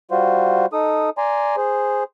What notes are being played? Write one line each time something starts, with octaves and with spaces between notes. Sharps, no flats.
G3 F4 F#4 C5
D#4 A4 D#6
D5 G#5 A#5 C6
G#4 C5